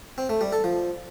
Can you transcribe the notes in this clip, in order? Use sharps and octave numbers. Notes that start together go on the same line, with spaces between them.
C4
A3
G3
A4
F3